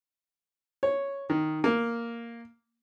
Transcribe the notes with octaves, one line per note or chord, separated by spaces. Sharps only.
C#5
D#3
A#3